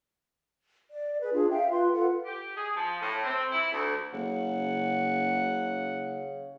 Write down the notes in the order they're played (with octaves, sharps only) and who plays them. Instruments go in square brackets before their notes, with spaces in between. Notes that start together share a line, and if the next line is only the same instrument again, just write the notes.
[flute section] D5
G#4 B4
D4 F4 G#4
E5 F5 G5
F4 B4 C6
F4 A4 B4 F#5
[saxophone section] G4
G#4
F3
A2
C4
E4
D2
[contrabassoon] F#1 [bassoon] C#3 [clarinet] F#5